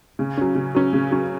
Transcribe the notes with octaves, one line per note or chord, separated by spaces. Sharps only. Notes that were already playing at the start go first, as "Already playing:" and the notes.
C#3
F#3 C#4
C#3
F#3 C#4
C#3
F#3 C#4